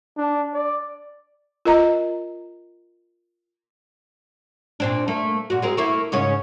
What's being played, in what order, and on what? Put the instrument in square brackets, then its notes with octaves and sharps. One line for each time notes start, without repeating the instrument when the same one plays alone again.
[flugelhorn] D4
D5
[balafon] F4 A#4 D#5 A#5
[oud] A#2 C4 D4
A3 A#3
A#2 F#4
G#3 C4 A#4
A3 A#3 E4
G#2 C#3 C#4